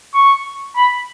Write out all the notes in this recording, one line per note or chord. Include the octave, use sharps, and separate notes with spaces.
C#6
B5